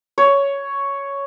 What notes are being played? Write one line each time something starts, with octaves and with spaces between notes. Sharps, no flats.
C#5